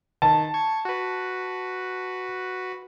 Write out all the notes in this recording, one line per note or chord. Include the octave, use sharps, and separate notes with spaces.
D#3 A5
C#6 G#6
F#4 B4